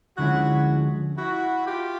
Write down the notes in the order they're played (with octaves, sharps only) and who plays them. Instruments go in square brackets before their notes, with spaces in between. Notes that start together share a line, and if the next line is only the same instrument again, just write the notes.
[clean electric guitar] D2 D3 F3 G#3 C#4 [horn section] E4 F#4
[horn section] E4 F#4
F4 G4